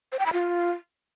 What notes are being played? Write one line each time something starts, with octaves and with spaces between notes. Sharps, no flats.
C5
G5
B5
F4